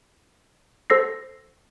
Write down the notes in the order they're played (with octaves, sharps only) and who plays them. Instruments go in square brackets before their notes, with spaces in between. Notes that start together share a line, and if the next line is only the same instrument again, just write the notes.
[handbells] A4 C5 E6 A#6 C7